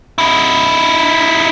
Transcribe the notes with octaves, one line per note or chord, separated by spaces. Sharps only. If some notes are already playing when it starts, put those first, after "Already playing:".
D#4 E4